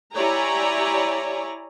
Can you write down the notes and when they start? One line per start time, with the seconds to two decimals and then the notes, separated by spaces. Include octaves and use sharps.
0.14 E4 G4 C#5 D5 G#5 A#5